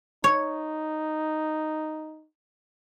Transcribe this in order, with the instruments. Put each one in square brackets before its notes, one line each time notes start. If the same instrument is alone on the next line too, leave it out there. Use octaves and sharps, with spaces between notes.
[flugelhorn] D#4 [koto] C#5